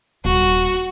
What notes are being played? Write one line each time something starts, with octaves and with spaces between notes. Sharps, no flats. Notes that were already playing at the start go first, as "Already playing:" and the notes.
D#1 F#4